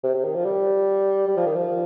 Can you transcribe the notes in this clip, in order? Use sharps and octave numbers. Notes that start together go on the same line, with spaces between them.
C3
C3
D#3
F3
G3
G3
F3
D#3
F3